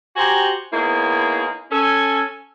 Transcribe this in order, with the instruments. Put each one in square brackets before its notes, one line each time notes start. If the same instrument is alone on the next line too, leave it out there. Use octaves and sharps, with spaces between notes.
[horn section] F#4 G4 C5 G#5 A#5
A#3 B3 D#4 E4 G#4 C#5
C#4 A4 G#5